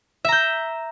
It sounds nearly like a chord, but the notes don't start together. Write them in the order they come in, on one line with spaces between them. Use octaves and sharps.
E5 A#5 G6